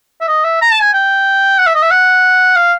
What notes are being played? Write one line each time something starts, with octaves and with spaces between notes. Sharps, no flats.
E5
D#5
E5
A#5
A5
G#5
G5
F#5
E5
D#5
E5
F#5
F5